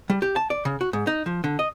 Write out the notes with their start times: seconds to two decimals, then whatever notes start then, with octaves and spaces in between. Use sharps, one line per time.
0.10 G3
0.22 G4
0.36 A5
0.50 D5
0.65 C#3
0.81 F#4
0.93 G#2
1.07 D#4
1.26 F3
1.44 D3
1.59 D#5